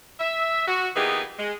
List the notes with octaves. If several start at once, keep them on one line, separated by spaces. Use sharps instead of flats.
E5
F#4
E3 A#3 B3 D#4 G4 G#4
G#3